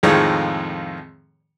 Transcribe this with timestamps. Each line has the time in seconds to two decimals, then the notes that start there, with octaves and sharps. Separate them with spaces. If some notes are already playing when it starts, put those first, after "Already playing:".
0.03 F2 A2 D#3 F3 G#3 C#5